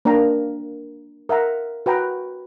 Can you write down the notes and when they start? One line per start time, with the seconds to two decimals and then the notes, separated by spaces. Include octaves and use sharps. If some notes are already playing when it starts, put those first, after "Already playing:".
0.05 A#3 D4 A#4 G5 A#5
1.29 A#4 E5 F#5 A#5
1.86 F#4 B4 G5 A#5